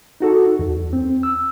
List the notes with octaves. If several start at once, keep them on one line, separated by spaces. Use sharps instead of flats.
D#4 F#4 A4
E2
C4
E6